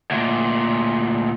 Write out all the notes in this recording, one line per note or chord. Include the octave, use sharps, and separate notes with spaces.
D2 A#2